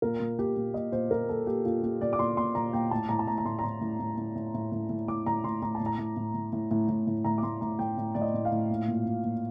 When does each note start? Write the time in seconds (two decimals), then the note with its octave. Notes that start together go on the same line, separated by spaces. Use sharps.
0.02 A#2 A#4
0.20 A#2
0.38 A#2 G4
0.57 A#2
0.74 A#2 D#5
0.92 A#2 C5
1.11 A#2 A#4
1.29 A#2 A4
1.47 A#2 G4
1.65 A#2 F4
1.83 A#2 G4
2.01 A#2 D5
2.13 D6
2.18 A#2 C6
2.37 A#2 C6
2.55 A#2 A#5
2.73 A#2 G5
2.91 A2 A5
3.09 A2 A#5
3.19 A5
3.27 A2 A#5
3.38 A#5
3.45 A2 C6
3.59 A#5
3.64 A2 C6
3.81 A2
4.00 A2
4.17 A2
4.35 A2
4.54 A2
4.72 A2
4.90 A2
5.08 A2 D6
5.26 A2 A#5
5.44 A2 C6
5.62 A2 A#5
5.75 A5
5.80 A2
5.86 A#5
5.98 A2
6.17 A2
6.34 A2
6.53 A2
6.71 A2
6.89 A2
7.07 A2
7.24 A2 A#5
7.38 D6
7.43 A2 C6
7.61 A2 A#5
7.79 A2 G5
7.98 A2
8.15 A2 D5
8.22 D#5
8.34 A2
8.45 F5
8.51 A2
8.70 A#2
8.88 A#2
9.06 A#2
9.24 A#2